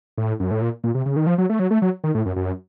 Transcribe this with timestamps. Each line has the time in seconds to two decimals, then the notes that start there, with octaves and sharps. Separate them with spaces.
0.18 A2
0.40 F#2
0.51 A2
0.62 A#2
0.84 A#2
0.95 C3
1.06 C#3
1.16 D#3
1.27 F3
1.38 F#3
1.50 A3
1.59 F#3
1.71 A3
1.82 F#3
2.04 D#3
2.15 A2
2.26 F#2
2.36 F#2